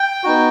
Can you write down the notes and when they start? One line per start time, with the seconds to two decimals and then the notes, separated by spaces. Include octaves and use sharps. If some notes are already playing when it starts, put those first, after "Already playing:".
Already playing: G5
0.24 B3 D#4 F#4